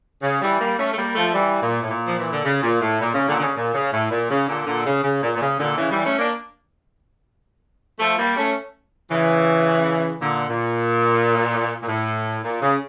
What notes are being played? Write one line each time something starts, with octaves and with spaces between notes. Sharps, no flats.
C#3
E3 G3
G3 A#3
A3 C#4
A3
G3 A#3
F3 A3
E3 G3
A#2
A2
A#2
F3
E3
D3
C#3
A#2
A2
A#2
C#3
A#2 D3
D3
C#3
A#2
C#3
A2
A#2
C#3
A#2 D3
A#2 D3
C#3
C#3
A#2
A#2
C#3
A#2 D3
C#3 E3
E3 G3
A3 C#4
A#3 D4
F3 A3
G3 A#3
A3 C#4
C#3 E3
A#2 D3
A#2
A#2
A2
A#2
C#3